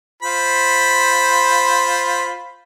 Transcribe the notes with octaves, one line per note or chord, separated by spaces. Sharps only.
F4 C5 B5